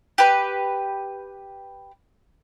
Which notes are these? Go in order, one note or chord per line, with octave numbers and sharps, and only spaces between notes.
G4 B4